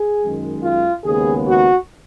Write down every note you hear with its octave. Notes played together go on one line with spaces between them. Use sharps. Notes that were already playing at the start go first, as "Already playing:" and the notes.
Already playing: G#4
F#2 D#3 G#3
F4
D#2 C#3 G#3 B3 G#4
F#4